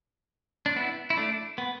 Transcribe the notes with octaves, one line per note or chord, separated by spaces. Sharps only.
D4
B3 E4
E4
A3 D4
B3